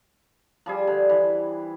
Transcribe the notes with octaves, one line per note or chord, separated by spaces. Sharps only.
F3 G3 G#4
D3
E3